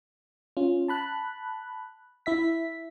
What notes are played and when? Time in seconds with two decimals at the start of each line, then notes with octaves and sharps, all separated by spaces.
0.57 C#4 F4
0.88 A5 B5 F#6
2.26 E4 E5 B6